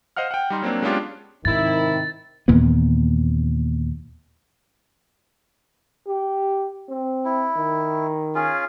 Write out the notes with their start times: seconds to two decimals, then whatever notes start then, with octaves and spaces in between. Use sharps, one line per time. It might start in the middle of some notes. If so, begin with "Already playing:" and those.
0.16 C5 D#5 F5 F#5 F6
0.31 F#5 G5
0.50 G3 D#4 C6
0.62 F#3 A#3 C4 D4
0.82 G#3 B3 C#4 D4 F4 G4
1.45 G#2 C3 D#3 E4 A6
2.48 D#2 A#2 E3 B3
6.07 G4
6.89 C4
7.25 E4
7.56 D#3
8.35 C#4 F4 G#4